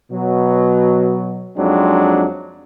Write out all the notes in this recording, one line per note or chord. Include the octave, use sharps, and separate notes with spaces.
B2 F#3
F2 F#3 G#3 C4 D4 D#4